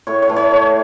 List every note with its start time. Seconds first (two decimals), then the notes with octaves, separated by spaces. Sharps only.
0.07 A2 C#5
0.22 C#5
0.29 E3 A3
0.36 C#5
0.52 A2